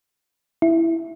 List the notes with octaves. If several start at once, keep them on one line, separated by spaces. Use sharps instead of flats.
E4